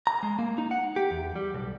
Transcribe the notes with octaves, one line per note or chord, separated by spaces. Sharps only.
A#5
G#3
A#3
D#4
F#5
G4
E2
G3
B1